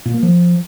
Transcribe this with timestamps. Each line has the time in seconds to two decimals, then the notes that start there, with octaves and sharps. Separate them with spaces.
0.05 A#2
0.14 A#3
0.23 F3